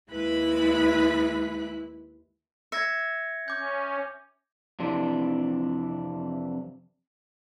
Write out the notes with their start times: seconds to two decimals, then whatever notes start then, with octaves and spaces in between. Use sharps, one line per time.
0.11 D#2 G#3 E4 B4 B5 F#6
2.72 E5 G#6 A#6 C#7
3.48 C#4 D6 G6
4.79 F2 C3 E3 D4